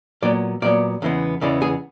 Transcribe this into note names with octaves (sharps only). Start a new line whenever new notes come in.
A#2 F#3 B3 D5
A#2 F#3 B3 D5
E2 C#3 E3 G#3 B3
E2 C#3 E3 G#3 B3 D5
G#4